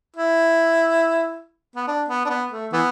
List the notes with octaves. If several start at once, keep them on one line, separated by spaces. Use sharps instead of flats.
E4
B3
D4
B3
D4
B3
A3
E3 B3